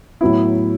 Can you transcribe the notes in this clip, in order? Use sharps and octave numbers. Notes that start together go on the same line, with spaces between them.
A2 F#3 B3 E4